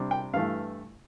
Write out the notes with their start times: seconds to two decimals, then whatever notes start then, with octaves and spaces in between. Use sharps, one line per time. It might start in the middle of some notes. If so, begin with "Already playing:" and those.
Already playing: C3 G3 D4
0.11 G5
0.33 G2 E3 A3 F5